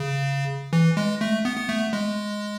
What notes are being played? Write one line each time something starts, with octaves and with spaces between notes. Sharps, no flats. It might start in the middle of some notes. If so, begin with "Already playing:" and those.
Already playing: C#3
E3
G#3
A3
B3
B3
A3
G#3